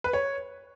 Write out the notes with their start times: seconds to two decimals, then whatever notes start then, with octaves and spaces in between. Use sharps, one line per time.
0.04 B4
0.13 C#5